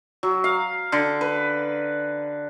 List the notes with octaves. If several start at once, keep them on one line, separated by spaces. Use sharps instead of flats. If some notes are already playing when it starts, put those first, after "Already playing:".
F#3
F5
D3
B4